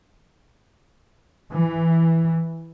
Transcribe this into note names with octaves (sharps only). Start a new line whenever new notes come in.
E3